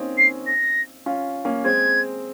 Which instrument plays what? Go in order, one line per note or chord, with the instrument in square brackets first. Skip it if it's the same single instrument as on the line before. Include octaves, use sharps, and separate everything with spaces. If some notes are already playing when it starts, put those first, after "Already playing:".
Already playing: [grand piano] A#3 C4 C#4 D#4
[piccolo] C7
A#6
[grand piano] C#4 F4
A#3 C#4
[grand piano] G#3 C4 [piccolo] G#6